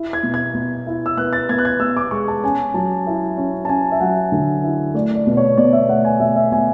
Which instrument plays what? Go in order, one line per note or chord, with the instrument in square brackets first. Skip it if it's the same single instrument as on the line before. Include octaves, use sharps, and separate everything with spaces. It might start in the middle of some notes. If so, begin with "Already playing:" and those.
Already playing: [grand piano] E4
G#6
B2
G#6
B2
E4
E6
B3 F#6
A6
B3 G#6
F#6
G#6
B3 E6
D6
G#3 C#6
A5
C#4 G#5
F#3 A5
E4
C#4
A5
C#4 G#5
E5
F#3 F#5
D3
E4
A3 D5
D5
B2
C#5
B2 D5
E5
A3 F#5
G#5
B2 E5
E5
B2 G#5